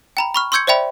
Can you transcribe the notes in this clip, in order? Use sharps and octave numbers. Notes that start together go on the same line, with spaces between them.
G5 A#5 B5
B5 C#6 F6
C6 C#6 E6 G6 G#6 C#7
C5 D5 E5 G5 B5